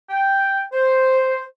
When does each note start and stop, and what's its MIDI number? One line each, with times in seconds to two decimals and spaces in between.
0.10 0.62 79
0.73 1.44 72